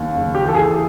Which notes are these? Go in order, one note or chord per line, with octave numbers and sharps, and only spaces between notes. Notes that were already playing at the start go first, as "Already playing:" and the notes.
Already playing: D#2
F#1
G4
E3 A4
G#4